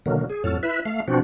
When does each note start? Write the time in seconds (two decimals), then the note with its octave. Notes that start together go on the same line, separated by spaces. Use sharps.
0.06 B2 D3 D#3 F#3 A#3
0.30 G#4
0.44 F2 A2 F#3 A4 F6
0.63 E4 B4 E5
0.85 A3 F5
1.08 B2 F3 C4 D4 F#4